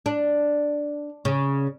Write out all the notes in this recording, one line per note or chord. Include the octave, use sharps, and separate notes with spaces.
D4
C#3